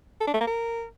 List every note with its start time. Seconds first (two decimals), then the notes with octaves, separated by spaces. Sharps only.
0.21 A4
0.27 D4
0.34 A3
0.41 A#3
0.47 A#4